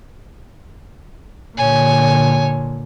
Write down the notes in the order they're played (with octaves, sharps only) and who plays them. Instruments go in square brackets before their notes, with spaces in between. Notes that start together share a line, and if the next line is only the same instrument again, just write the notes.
[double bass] A#2 D3 [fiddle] C#5 G#5